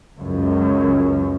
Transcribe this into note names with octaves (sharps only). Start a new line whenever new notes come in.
C#2 F#2